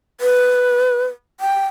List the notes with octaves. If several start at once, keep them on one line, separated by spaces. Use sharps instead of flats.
B4
G5